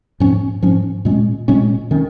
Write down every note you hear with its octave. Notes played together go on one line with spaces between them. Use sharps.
G#2 F3 C#4
G#2 F3 C#4
A#2 G#3 C#4
A#2 G#3 C#4
D#3 C#4